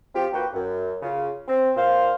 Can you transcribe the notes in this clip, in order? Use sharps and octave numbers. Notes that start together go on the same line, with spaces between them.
F3 C4 F4 G4
D#2 A#3 F#4 B4 G5
F#2
C#3 F4
C4
A#2 C5 F5